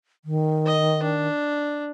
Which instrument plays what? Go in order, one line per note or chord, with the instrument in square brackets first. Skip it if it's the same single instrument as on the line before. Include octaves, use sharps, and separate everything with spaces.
[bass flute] D#3
[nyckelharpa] D#5
D4